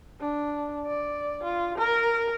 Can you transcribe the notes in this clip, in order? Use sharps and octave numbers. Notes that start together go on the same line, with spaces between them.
D4
D5
F4
A#4